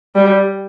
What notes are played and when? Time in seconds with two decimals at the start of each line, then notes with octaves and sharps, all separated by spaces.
0.15 G3